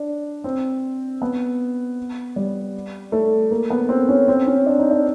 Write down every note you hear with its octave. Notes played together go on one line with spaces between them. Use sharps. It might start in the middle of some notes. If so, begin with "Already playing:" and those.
Already playing: D4
C4
B3
G3
A3
A#3
B3
C4
C#4
C4
C#4
D4
D#4
D4